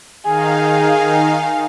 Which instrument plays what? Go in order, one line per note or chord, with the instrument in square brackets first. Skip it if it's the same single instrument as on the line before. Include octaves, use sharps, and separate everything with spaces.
[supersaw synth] D#3 D#4 F5 [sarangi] G#4 [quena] G#5